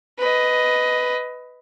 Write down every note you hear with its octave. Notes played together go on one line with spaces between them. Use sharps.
B4 D#5